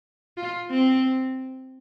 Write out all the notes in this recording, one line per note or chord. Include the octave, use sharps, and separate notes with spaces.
F4
C4